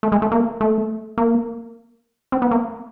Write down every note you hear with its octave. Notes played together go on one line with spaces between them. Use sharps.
A3
G#3
A3
A#3
A3
A#3
C4
B3
A#3